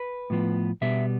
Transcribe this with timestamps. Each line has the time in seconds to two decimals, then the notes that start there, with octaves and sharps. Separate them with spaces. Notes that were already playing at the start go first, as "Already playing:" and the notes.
Already playing: B4
0.30 A2 F3 B3
0.81 B2 G3 B3 E5